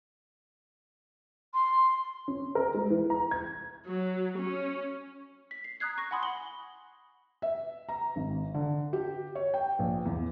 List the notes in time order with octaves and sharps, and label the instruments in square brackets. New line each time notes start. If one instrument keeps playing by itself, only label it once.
[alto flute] C6
[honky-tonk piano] C#4
A#4
G#3
E3
A#5
G#6
[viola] F#3
C#4
[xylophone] B6
C7
A#5 D#6 F#6 G#6 C7
C#6 A#6
F#5 G#5 B5 C6 D#6
F#5 F#7 G7
[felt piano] E5
A#5
G#1
D3
G4
C#5
G5
A#1
E2